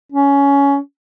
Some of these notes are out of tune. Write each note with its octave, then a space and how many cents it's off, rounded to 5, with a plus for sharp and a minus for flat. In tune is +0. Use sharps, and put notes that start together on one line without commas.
C#4 +15